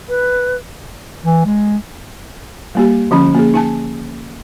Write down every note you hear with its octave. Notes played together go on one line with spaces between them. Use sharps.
B4
E3
G#3
G3 A#3 G4
D3 F3 C#4 B5
A#3 G#4
D#4 G#5 A5